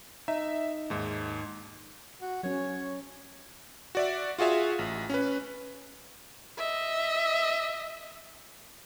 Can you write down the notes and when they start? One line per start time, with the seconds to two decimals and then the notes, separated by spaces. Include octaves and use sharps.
0.28 D#4 E5
0.90 D#2 G#2
2.22 F#4
2.43 F#3 C#4 C#5
3.95 F#4 D5 E5
4.39 F4 F#4 G#4 E5 F5
4.79 A1
5.10 C#4 B4
6.57 D#5 E5